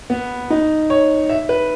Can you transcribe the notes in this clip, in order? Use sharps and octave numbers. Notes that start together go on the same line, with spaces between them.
B3
D#4
C#5
E5
B4